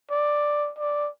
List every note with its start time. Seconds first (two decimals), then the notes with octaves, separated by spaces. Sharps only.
0.11 D5
0.79 D5